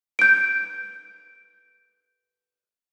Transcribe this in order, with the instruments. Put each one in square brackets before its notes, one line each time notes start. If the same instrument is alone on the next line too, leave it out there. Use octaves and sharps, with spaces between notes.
[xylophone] G6 D7